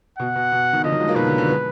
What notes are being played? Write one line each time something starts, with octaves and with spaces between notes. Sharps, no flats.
B2 F#5
B2
B2
B2 D#3
D3 F3 D#5
D#3 F#3
F3 G#3
F#3 A#3
B2 D#3 B4
D3
D3 F3
G#3 B3